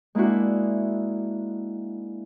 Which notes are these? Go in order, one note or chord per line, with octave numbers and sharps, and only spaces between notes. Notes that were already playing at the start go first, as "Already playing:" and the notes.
G#3 A#3 D4 E4 F#4